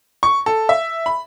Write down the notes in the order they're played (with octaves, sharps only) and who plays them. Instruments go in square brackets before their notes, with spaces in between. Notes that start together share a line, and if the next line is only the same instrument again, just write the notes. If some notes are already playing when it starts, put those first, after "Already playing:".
[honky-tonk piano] C#6
A4
E5
B5